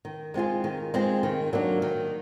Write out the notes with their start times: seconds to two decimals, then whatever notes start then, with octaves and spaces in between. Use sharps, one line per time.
0.05 D#3
0.34 G#3 C4 F4 G#4
0.64 D#3
0.94 G#3 C4 F4 G#4
1.23 D#3
1.53 F#3 A#3 D4
1.82 D#3